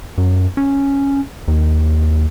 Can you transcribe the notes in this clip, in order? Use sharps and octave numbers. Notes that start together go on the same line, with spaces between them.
F#2
C#4
D#2